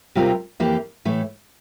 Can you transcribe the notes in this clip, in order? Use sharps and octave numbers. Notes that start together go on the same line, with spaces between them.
C3 G3 C4 F4 A#4
F2 E3 A#3 E4 G4
A2 E3 A3